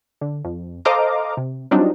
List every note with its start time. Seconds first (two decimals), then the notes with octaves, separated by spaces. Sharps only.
0.21 D3
0.45 F2
0.85 A4 C5 D#5 F5 A#5 D6
1.37 C3
1.71 F#3 G3 C4 D4 D#4 F4